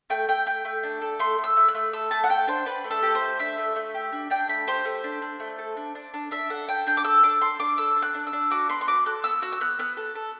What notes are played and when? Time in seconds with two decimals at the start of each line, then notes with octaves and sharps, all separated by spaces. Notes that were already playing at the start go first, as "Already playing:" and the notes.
0.10 A3 G5
0.28 A3 G5
0.46 A3 G5
0.65 A3
0.83 D4
1.02 A4
1.19 A3 C6
1.38 A3
1.44 E6
1.57 A3
1.68 F#6
1.75 A3
1.93 A4 E6
2.11 A3 A5
2.24 F#5
2.30 A4 G5
2.47 D4 C5
2.66 D4 B4
2.84 A3
2.90 A4
3.02 G4
3.15 C5
3.21 A3
3.39 D4 E5
3.57 A3
3.76 A3
3.94 G4
4.13 D4
4.30 D4 G5
4.48 A3 B5
4.67 G4 C5
4.85 A3
5.04 D4
5.22 D4
5.40 A3
5.58 A4
5.77 D4
5.95 D4
6.14 D4
6.31 D4 E5
6.50 A4 F#5
6.68 D4 G5
6.87 D4 G5
6.97 D6
7.04 A4 E6
7.23 D4 D6
7.41 D4 C6
7.59 D4 D6
7.78 A4 E6
7.96 D4
8.02 F#6
8.14 D4
8.27 E6
8.33 D4
8.51 F#4 D6
8.69 B3 C6
8.81 C6
8.87 F#4 D6
9.06 A4 F#6
9.24 B3 E6
9.42 F#4 E6
9.52 E6
9.60 B3 F#6
9.79 B3 F#6
9.97 A4
10.15 A4